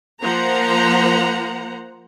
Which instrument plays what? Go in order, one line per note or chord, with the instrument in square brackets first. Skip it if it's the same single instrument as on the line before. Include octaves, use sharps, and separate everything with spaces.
[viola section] F3 A#3 C5 F#5 A#5